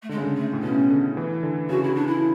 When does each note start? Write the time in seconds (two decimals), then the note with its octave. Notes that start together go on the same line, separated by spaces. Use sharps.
0.02 A3
0.09 D3 G#3
0.17 C#3
0.24 D3
0.36 A3
0.53 A2
0.62 B2 C#4
0.90 D3
1.17 E3
1.43 D3
1.69 C#3 F#4
1.83 E4
1.94 D4
2.07 E4